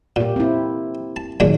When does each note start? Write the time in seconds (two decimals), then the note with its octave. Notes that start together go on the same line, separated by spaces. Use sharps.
0.16 A#2 A#3 G4
0.36 C4 E4
1.16 A5
1.40 A#2 D#3 F#3 G#3 D4